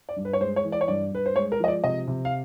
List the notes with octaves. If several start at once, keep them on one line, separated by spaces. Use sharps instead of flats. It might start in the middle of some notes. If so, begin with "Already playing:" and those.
D5
G2
B4
C#5
G#3 C5
C#5
E3
D5
C#5
G2 D5
G2 B4
C5
G#3 C#5
A#4
F3 D#5
D5
C3 D#5
C3
F5